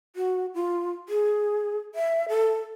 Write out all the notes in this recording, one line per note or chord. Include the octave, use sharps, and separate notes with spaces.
F#4
F4
G#4
E5
A4